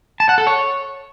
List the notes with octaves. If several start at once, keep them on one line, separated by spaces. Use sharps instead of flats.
A5
F#5
A4
C#5